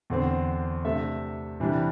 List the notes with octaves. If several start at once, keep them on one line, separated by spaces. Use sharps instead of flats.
E2 D3 C4
C3 A3 D4 A4 E5
C3 E3 G3 D4 G4